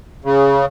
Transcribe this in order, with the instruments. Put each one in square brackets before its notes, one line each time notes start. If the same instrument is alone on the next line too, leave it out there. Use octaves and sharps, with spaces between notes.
[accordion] C#3